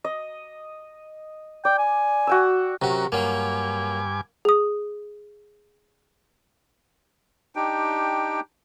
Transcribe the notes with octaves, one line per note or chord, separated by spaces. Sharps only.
D#5
D5 G5
G#5
F#4 G5 E6
C3 F#3 C#4 F#4 A#4
G2 F#3 A#3 G#5 D6
G#4 D#6
D4 D#4 G4 G5